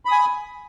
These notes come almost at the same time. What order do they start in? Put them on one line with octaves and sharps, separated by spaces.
B5 D#6 G#5